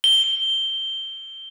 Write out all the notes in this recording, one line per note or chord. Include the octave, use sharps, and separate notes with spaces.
G7